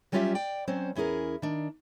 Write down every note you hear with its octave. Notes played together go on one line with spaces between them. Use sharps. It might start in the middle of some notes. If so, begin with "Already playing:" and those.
F#3 G3 C#4 F4 G4 E5
D5 G5
F#3 C4 C#4 C5
E2 C#4 E4 G#4 A#4
D#3 D4